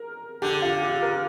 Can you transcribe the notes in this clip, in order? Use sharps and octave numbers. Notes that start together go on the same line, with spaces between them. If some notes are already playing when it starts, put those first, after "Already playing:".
Already playing: A#4
D3 G4
F4
G4
A#4